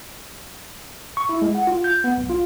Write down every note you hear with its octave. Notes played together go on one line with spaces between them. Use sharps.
C#6
E4
G#3
F#5
F4
G6
B3
B1
F4